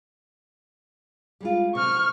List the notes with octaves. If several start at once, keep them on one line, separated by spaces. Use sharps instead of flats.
G3 G#3 F4
C3 C#6 F6